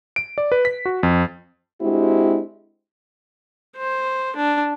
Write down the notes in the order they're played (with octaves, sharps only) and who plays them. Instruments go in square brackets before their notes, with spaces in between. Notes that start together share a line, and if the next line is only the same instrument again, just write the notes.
[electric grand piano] D7
D5
B4
B6
F#4
F2
[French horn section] G#3 C4 D4 E4 F#4 G4
[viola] C5
D4